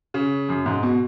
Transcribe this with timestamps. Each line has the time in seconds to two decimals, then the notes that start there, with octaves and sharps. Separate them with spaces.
0.14 C#3
0.49 F#2
0.66 G#2
0.83 B2